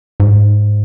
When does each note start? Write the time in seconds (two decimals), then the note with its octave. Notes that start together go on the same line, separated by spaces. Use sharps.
0.20 G#2